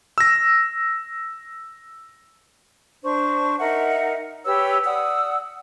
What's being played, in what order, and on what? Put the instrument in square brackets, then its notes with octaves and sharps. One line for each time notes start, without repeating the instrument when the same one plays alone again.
[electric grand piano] E6 A#6
[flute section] D4 C5 C#6
D#4 A#4 E5 F#5
G4 B4 C#5 E6
D5 F#5 D#6 E6